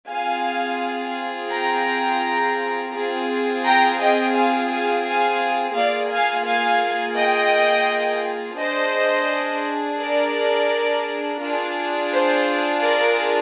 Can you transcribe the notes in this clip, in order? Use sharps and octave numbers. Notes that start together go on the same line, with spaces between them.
C4 F4 G#4 F5 G#5
G5 A#5
C4 F4 G#4
G5 A#5
D#5 G5
F5 G#5
F5 G#5
F5 G#5
A#3 F4 G#4 D5 F5
F5 G#5
F5 G#5
D#5 G5
D4 G#4 C5 D#5
A#4 D5
D4 F4 G#4
C5
A#4 D5